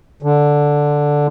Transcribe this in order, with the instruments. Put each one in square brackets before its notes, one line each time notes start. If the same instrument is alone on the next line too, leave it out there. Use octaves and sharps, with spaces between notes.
[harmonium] D3